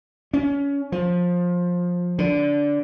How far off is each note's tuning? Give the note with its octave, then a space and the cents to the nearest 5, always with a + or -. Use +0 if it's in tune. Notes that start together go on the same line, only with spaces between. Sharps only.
C#4 +25
F3 +20
D3 -15